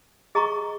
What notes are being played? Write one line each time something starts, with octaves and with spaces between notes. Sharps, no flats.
G#4 D#5 A#5 C#6